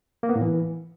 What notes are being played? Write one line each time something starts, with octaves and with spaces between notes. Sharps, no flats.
A#3
B3
A2
E3